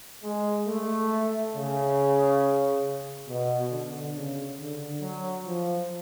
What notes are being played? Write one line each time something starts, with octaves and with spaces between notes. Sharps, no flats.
G#3
A3
C#3
B2
D3
C#3
D3
F#3
F3